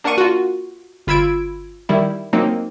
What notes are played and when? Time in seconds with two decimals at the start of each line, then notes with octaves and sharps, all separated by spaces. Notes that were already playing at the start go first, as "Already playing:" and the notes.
0.04 A#3 D4 A#4 F#5 C#6 D#7
0.18 F4 F#4
1.07 G1 F4 B5 E6 G#6 D7
1.89 D#3 G3 E4
2.33 F#3 A#3 C4 D#4